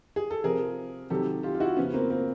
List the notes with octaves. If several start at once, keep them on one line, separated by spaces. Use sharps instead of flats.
G#4
A4
C3 F3 G#4 A#4
C3 D#3 F#3 G4 A4
F4 G4
F4
E4 F#4
C#3 F3 B3 C#4
A#3 C4
A#3 C4